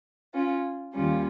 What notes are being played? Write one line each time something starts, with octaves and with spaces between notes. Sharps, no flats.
C#4 F4
D#2 D#3 G3 C#4 F4